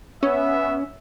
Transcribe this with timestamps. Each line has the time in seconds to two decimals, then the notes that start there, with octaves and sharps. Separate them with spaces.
0.23 B3 C#4 E5